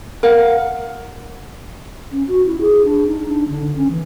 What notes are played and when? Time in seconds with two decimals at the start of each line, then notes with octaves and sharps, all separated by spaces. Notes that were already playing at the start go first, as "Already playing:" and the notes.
0.23 A#4 F5 F#5
2.12 C#4
2.28 F#4
2.46 E4
2.61 G#4
2.85 D4
3.07 D#4
3.28 D4
3.48 D3
3.76 C#4
3.91 E3